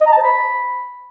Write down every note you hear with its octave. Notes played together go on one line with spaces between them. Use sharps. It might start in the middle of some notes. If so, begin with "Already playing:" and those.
D#5
A#5
A5
C5
B5